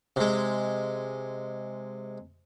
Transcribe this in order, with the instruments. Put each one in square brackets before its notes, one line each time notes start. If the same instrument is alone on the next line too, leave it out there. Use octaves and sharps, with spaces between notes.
[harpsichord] C3 G#3